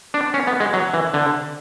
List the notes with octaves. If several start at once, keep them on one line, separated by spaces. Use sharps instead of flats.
D4
C#4
B3
G#3
F#3
E3
D3